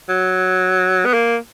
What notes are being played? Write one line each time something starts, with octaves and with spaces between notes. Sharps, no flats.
F#3
B3
A#3